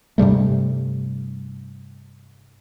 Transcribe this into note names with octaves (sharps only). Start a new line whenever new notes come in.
G2 C3 G3 A3